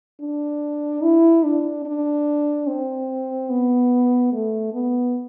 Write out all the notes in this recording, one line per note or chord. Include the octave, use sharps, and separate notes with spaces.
D4
E4
D4
D4
C4
B3
A3
B3